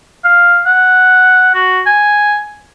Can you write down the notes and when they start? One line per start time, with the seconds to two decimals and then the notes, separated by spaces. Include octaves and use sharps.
0.25 F5
0.66 F#5
1.55 F#4
1.87 G#5